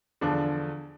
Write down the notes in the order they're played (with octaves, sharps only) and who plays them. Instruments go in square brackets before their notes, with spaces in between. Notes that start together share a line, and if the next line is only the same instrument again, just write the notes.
[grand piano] E2 D3 F3 D4